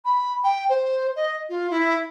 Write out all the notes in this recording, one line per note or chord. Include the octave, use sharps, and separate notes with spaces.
B5
G5
C5
D#5
F4
E4